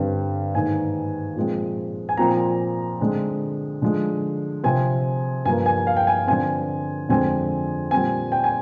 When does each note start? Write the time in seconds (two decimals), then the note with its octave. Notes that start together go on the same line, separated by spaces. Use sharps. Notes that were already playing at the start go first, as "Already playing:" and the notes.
Already playing: G2 D3 G3 C4
0.54 G#2 D#3 A#3 G#5
1.36 A#2 F3 G#3 C4
2.09 G#5
2.17 A#2 F3 C4 A#5
3.00 D3 G#3 C4
3.82 D3 F3 G#3
4.64 C3 F3 C4 G#5
5.45 G2 F3 A#3 G#5
5.66 G#5
5.87 F5
5.97 G5
6.07 G#5
6.27 D3 F3 C4 G#5
7.09 F2 D3 F3 G#3 C4 G#5
7.91 A#2 G3 C4 G#5
8.32 G5
8.44 G#5